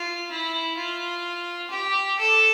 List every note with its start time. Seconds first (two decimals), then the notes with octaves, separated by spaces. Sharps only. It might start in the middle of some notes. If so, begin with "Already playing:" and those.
Already playing: F4
0.31 E4
0.77 F4
1.71 G4
2.18 A4